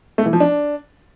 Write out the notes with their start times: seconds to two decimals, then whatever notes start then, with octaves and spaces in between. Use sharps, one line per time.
0.18 A3
0.26 E3
0.33 F3
0.40 D4